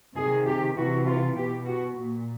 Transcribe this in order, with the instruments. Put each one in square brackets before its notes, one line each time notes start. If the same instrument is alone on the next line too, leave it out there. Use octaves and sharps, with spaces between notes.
[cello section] C3 D#3 G#4
G4
C3 E3 F#4
F4
B2 G4
F#4
A#2